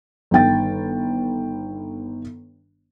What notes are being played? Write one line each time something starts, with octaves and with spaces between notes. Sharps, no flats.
G1 D#3 G5 A6